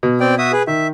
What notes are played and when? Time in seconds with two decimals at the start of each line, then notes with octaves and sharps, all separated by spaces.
0.03 B2
0.20 C4 D5 G5
0.38 F#4 E5 D#6
0.52 G#4 B4
0.67 D#3 E5